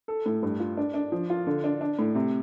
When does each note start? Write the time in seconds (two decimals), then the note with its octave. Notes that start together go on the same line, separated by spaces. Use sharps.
0.08 A4
0.26 A2
0.42 G2
0.60 F4
0.77 D4
0.94 D4
1.12 F3
1.30 F4
1.47 D3
1.64 D4
1.81 D4
1.99 A2
2.15 C3